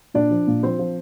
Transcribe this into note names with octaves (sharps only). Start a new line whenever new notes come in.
A#2 D4 D5
F3
A#2
F3 C4 C5
F3